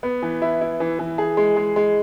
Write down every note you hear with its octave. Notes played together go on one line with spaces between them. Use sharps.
B3
E3
E4
E4
E3
E3
G#4
G#3
G#3
G#3